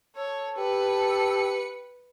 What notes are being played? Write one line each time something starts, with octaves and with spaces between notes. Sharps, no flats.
A4 C#5
G4 B4 C#7